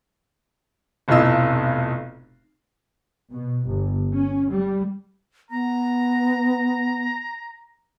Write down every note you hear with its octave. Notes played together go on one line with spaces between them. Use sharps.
F1 B1 A2 F4 D#5 E6
B2
G1
C#4
G3
B3 A#5